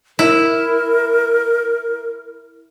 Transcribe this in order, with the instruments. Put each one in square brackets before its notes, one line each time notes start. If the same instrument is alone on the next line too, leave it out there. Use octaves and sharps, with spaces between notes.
[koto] E4 [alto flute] A#4